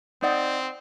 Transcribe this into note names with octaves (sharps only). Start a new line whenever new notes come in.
C4 D#4 D5 F#5